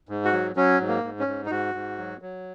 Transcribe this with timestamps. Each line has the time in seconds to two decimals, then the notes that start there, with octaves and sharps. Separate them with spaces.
0.09 G#2
0.25 F#4
0.33 F#3
0.56 F#3 C#4
0.80 G#2
0.88 A#3
1.04 G#2
1.19 C#4
1.27 G#2
1.46 D#4
1.51 G#2 F#4
1.75 G#2
1.98 F#3
2.22 F#3